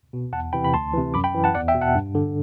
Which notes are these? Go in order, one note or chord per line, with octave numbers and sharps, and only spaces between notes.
B2
E2 F#5 A5
C3 E3 G5 B5
B5
D2 A5 C6
C3 E3
F#2 B5 D6
G5 B5
E3
F#5 A5
E2 D5 F#5
E5 G5
B2
F#5 A5
G2
D3